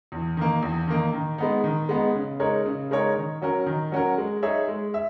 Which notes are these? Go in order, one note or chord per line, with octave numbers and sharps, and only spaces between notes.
E2
D#3 A#3
E2
D#3 A#3
D#3
G#3 B3 D#4
D#3
G#3 B3 D#4
C#3
G#3 D#4 A#4 C#5
C#3
G#3 D#4 A#4 C#5
D#3
F#3 C#4 F#4 A#4
D#3
F#3 C#4 F#4 A#4
G#3
D#4 G#4 C#5 E5
G#3
E5